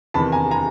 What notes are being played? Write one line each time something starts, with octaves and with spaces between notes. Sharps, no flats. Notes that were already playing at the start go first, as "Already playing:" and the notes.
E2 C3 D#3 A5 B5
G#5 A#5
G#5 A#5